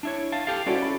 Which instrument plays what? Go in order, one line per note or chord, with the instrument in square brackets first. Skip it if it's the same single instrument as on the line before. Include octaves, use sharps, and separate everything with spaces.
[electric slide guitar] D4 E4 C#5
F5 A5
G4 A4 F5
[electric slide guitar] C#4 A4 D5 [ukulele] E4 F#4 C5
[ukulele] G#4 B5